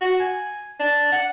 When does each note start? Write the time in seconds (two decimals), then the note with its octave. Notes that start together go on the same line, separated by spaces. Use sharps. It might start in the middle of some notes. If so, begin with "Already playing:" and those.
0.01 F#4
0.20 G#5
0.80 D4
1.12 F#5